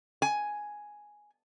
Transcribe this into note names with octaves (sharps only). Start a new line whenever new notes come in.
G#5